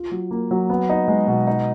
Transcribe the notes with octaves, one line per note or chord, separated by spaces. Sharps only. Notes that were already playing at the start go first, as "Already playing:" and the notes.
Already playing: F4
F#3
A#3
F#3
B3
D#4
G#3
B2
D#4